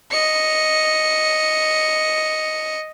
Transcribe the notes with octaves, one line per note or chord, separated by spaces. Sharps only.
D#5 C#7